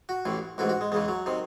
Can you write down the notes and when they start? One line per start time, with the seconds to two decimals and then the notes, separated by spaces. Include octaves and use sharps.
0.09 F#4
0.25 A1 A2 E3
0.58 A1 G#2 E3 F#4
0.69 F#4
0.81 G#3
0.92 E2 C#3 E3 G#3
1.08 F#3
1.26 C3 D#3